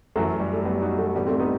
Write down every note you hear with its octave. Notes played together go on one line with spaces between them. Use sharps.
F#2 E3 F#3 A3
G3
A3
G3 B3
D#4 F#4
F#3 A3
A2 E3 G3 B3
A3 C4
B3 D#4